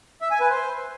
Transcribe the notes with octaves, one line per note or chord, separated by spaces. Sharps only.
E5
G#5
B4
C5